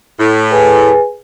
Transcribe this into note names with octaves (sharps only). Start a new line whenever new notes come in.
A2
G#4 B4 G#5